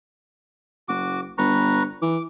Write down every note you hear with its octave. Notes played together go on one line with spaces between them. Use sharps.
F#1 F#4 D6
G1 B4 A#5 C#6
E3 D6